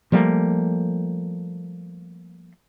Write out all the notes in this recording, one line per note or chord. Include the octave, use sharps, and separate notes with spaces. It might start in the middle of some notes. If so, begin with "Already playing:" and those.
F3 G3 A3 A#3